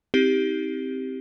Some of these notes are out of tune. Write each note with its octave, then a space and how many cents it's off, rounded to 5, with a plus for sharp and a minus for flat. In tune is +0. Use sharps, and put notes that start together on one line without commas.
C4 +0 D#4 +40 G4 +0